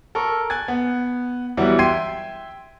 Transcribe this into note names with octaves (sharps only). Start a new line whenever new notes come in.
A4 A#4 C#6
G#5 F#6 G#6 A6
B3
E3 F#3 G3 B3 E4 F#4
E5 G5 C6 G#6 C7 D#7